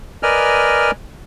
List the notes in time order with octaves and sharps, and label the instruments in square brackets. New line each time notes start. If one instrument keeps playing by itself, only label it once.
[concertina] A#4 B4 D5 D#5 G#5 F6